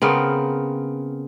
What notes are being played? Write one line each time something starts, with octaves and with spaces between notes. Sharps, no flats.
C#3 B3 C4 A#4